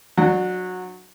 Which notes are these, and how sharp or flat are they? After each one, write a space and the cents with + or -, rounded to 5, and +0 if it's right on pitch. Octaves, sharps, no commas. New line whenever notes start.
F#3 -15 D4 +25